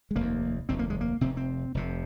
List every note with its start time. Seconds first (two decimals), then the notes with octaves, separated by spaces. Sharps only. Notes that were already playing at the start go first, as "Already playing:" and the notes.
0.11 G#3
0.16 F1 D#2 A#3
0.69 F1 D#2 C4
0.79 A#3
0.90 G#3
1.01 A#3
1.21 F1 F2 C3 C4
1.37 C4
1.74 F1 F2 C3